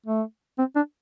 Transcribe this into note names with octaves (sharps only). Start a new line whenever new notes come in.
A3
C4
D4